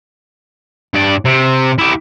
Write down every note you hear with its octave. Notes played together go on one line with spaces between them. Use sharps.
G2 D5
C3
E4 G4